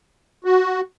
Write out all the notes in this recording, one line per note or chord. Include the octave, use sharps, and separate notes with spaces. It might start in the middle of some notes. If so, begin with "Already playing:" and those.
F#4